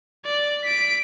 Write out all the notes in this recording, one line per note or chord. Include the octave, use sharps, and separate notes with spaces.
D5
B6 D7